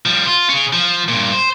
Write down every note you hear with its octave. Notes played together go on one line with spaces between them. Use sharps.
F3 G3
F4
C#4 G#4
F3
G2 A#2
C5